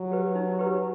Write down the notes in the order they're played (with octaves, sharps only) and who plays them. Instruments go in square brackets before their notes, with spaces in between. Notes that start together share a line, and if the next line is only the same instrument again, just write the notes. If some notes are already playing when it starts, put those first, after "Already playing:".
Already playing: [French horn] F#3
[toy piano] G4 B4
D#4
G4 B4